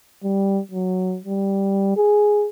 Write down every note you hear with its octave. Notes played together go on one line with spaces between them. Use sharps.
G3
F#3
G3
G#4